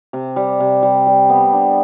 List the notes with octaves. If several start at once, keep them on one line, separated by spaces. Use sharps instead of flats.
C3
G3
C3
G3
G3
B3
D4